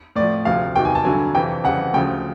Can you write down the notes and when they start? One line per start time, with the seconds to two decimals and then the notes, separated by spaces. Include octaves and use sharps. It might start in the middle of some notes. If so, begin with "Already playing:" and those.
0.16 A2 F3 D5
0.45 D2 C3 F3 F5
0.76 E2 C3 D#3 F#3 G5
0.85 G#5
0.95 A5
1.05 G2 D3 F#3 G#5
1.35 F2 C3 E3 G5
1.64 F2 C#3 E3 G3 F#5
1.94 D2 C#3 F3 G5